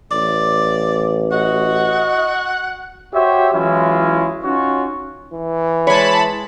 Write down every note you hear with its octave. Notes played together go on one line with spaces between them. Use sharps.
A1 D5
F#4 D#5 F#5
F#4 G4 C5 C#5 E5
E3 F#3 G#3 C#4 E4 F4
C#4 D#4 F4 F#4 C#5
E3
G#3 C#5 A5 B5